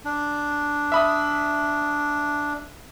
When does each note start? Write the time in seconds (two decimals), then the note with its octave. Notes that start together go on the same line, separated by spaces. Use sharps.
0.05 D4
0.92 E5 B5 D#6